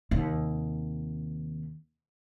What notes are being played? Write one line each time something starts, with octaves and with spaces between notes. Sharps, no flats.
D#2 C3